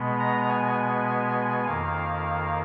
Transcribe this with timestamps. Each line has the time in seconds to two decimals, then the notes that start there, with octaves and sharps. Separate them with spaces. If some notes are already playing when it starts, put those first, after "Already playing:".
Already playing: B2 G#3 B3
0.19 A#5
0.48 G#5
1.66 F2 D#3 A#3 F5